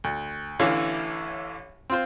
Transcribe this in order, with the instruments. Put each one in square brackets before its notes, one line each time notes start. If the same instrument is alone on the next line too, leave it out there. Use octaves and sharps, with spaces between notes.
[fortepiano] D2
A1 D3 E3 E4 C#5 F5
C4 F4 C5